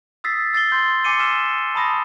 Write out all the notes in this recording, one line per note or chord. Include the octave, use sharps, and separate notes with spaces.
D#6 E6 A6 B6 C7
E6 A6 C7 G7
C6 G6
G#5 D6 C7 C#7 D#7 G7
D6 E6 F6 B6 E7
A5 B5 D#6 A#6